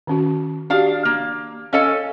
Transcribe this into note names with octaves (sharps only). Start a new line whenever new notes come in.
D#3 C#4 F#4
D4 F#4 G4 F5
A#3
C#4 A4 C#5 D#5 F5 G#5